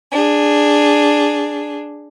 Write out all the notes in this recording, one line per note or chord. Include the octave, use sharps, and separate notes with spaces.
D4 G#4